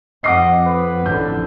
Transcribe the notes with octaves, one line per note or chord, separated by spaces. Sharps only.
F2 D#5 F#5 D6 C7
B4
A1 F2 D3 G6